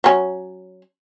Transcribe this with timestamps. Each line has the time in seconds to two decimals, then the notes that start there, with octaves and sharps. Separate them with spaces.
0.04 F#3 C#4